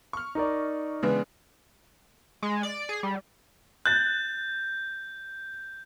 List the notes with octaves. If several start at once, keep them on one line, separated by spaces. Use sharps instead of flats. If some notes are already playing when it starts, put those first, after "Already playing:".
C#6 F6
D#4 A#4 D5
C#3 E3 G#3 B3 D4
G#3
D5
G#4
G3
F#6 G6 A6